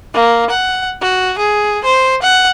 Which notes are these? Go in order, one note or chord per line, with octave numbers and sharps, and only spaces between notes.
A#3
F#5
F#4
G#4
C5
F#5